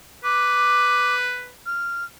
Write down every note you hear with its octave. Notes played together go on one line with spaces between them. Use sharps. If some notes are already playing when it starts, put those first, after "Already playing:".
B4 D6
F6